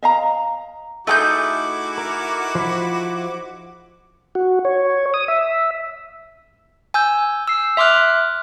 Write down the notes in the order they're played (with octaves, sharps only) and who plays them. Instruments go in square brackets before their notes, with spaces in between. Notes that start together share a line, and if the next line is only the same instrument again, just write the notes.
[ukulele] D#5 F5 A#5
[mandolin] A3 F#5 G6 [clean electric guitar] D#4 G#4 [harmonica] E4 F#4 D6
[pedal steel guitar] A#4
F3 B5
[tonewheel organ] F#4
C#5
D#6
E5
[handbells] G#5 E6 G6
E6 C7
E5 C6 D6 F6 F#6